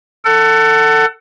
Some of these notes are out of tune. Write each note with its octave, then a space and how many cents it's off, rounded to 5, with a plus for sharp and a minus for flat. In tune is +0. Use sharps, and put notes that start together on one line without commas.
A4 +20 F#5 +25